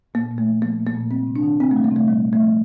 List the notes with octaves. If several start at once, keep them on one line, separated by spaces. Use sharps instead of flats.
A#2 A#3
A#2
A3
F3
F3 A#3
A#2
A#3
A#2
G3 C4
C3
D4
D#3
C3 C4
A3
G3
A#3
C3 A3
A#2 G3
A#2
A3
F3